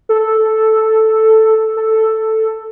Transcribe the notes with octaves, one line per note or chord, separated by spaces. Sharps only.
A4
A4